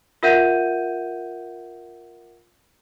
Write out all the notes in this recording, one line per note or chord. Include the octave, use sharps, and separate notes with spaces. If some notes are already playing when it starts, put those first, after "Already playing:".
F4 A#4 E5 F#5 G6 D#7